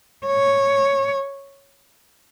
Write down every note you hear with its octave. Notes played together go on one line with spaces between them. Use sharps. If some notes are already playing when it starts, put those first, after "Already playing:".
C#5